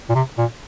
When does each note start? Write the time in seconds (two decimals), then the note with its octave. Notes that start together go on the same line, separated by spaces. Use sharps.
0.10 A#2
0.15 C3
0.38 A#2